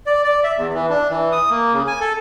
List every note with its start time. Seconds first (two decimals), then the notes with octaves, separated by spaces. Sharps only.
0.06 D5
0.24 D5
0.44 E5
0.57 E2
0.74 E3
0.90 D4
1.10 E3
1.32 D#6
1.50 A#3
1.73 C#3
1.87 G#5
2.00 A4